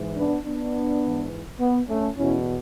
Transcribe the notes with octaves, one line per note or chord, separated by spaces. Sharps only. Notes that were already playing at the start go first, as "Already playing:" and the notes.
Already playing: G#2 E3
B3 D4
B3 D4
G#2 E3
B3
A3 C#4
E2 B2 C#4 E4